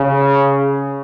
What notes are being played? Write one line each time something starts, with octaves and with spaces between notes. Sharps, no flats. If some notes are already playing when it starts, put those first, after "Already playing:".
Already playing: C#3